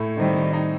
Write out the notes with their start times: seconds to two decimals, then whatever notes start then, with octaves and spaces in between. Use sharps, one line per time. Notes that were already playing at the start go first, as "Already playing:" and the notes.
Already playing: A2 A3
0.19 D#3 G3 C4
0.53 D#4